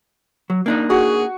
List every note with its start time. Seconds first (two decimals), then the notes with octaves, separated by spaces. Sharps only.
0.50 F#3
0.66 A#3 D4 D#4
0.90 F#4 G#4